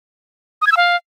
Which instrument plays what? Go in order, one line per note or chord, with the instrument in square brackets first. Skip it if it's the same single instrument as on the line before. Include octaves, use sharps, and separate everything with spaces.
[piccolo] D#6
G#6
E6
F5